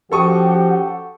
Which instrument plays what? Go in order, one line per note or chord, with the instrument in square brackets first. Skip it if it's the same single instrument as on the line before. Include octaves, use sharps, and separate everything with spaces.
[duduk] F3 [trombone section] C#4 F#4 G4 [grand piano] A4 C#6 D#6 [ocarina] F#5